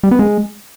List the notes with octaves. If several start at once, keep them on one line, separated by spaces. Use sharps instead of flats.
G3
B3
G#3